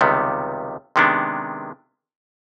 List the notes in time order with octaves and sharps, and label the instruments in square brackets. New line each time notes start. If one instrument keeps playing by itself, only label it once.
[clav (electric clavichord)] C#2 C3 D#3 G3 B3
C3 D#3 G#3 B3 D4